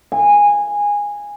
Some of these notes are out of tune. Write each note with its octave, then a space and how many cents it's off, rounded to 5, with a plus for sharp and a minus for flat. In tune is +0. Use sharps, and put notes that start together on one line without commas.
G#5 -15